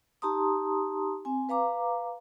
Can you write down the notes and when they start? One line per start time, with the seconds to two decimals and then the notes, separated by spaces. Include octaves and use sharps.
0.22 D#4 G4 A5 A#5 C6 D#6
1.25 C4 G#5
1.49 B4 F5 A#5 D6